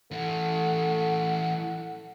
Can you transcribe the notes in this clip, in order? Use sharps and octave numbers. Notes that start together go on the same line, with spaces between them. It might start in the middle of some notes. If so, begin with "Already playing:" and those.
E3 A3 C#4 F#5